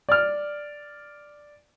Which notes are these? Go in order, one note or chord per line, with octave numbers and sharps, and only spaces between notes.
D5 F6